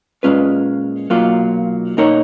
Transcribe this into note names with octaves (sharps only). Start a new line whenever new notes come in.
A#2 G#3 C#4 F4 B4
B1 A#2 F#3 A#3 F4
B2 A#3 D#4 A#4 C#5